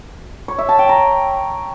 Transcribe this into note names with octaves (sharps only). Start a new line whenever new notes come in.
C#5
E5
A5
G5
A#5